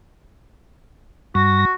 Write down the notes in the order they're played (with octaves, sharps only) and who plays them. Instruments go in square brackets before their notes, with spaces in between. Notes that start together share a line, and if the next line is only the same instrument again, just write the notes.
[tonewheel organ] G2 A#6 [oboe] F#4